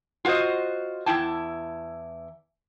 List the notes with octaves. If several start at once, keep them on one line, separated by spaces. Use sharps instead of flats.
F4 F#4 A#4 C5 D#5
E2 C3 E4 G5 A5